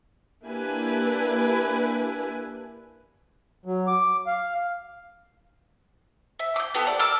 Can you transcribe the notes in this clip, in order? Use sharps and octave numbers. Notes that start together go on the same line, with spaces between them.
A#3 D4 E4 G4 B4 G#5
F#3
D6
F5
E5
D6 G6
B3 G4 A4
D5
A#4 A5 D6 E6